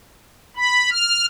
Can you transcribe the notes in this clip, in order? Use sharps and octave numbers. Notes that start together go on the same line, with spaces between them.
B5
F6